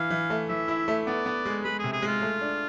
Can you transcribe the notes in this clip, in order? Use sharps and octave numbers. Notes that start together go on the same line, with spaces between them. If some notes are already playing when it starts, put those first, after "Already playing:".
Already playing: E3 F5
E3
A3
E3 E5
E4
A3
B3 D5
B3
G#3
G#3 B4
G#4
C3
G#4
G#3
F4
A3
D4